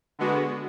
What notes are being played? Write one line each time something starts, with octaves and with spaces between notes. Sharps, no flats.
D3 G#3 B3 F#4